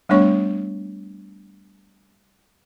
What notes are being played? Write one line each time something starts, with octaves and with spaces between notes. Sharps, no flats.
G3 A3 B3 D4 C#5 C#6